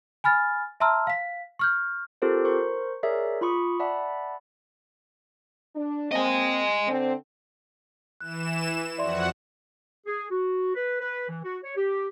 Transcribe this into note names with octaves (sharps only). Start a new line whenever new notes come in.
G#5 B5 F6 A6
E5 A5 A#5 C6 E6 F6
F5 B6
C#6 F6 G6
C4 F4 G4 A4 A#4 C5
A#4 C5 C#6
G#4 A#4 C#5 D5 E5
F4 B5 C#6 D#6
D5 E5 F#5 A5 B5
D4
A#3 C4 D#5 G#5
D3 C4
E3 F#6 E7
F2 F#4 D5 E5 F#5 C6
G#4
F#4
B4
B4
E3
F#4
C#5
G4